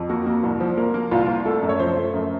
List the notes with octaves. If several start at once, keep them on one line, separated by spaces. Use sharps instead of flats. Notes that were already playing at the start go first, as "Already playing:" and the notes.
Already playing: F2
A#3 F#4
A#3
C2
F3
A#3 A#4
A#3
C2 F4
C2
A3 A4
F#2
C#5
F3 C5
A3
F#2